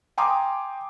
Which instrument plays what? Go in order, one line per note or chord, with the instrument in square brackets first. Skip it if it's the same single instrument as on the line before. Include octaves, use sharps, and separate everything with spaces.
[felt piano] G5 G#5 A#5 C6 D6 D#6